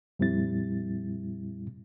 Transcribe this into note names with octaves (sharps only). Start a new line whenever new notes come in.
F2 A#2 G3 C4 E4 A6